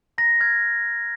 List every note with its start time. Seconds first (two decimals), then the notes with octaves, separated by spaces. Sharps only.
0.18 A#5 A#6
0.40 F6 G#6